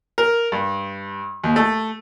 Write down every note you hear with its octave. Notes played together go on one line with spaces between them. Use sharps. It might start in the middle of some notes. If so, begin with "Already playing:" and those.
A#4
G2
D#2
A3